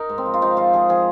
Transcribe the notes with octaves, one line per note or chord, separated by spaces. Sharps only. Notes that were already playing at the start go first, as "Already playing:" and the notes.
Already playing: D#4 A#4
G#2
C4
F3
F4
F3 D#4
F3 F4
F3 G#4
F3 G#4